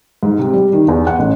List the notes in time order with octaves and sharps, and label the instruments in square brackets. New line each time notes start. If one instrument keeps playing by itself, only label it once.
[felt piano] G#2
C3
G3
D#3
E2
F#5
A1